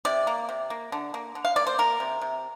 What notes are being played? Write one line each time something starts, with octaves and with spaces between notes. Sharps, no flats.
C3 D5
A#3
C3
A#3
D3
A#3
D3
F5
A#3 D5
C5
A#3 A#4
C3
C3